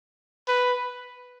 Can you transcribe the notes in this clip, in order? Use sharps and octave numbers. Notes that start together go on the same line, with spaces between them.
B4